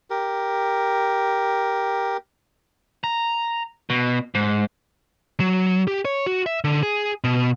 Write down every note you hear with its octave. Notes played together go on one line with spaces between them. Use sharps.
G4 A#4
A#5
B2
G#2
F#3
G4
C#5
F#4
E5
D3
G#4
B2